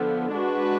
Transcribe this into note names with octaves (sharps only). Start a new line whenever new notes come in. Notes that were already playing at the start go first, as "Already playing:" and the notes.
Already playing: D3 F3 B3
G#3 D4 F#4 B4